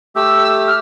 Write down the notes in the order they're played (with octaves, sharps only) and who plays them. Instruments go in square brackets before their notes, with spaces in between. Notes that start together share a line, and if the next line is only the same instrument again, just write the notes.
[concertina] A3 G4 [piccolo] E6
[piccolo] F6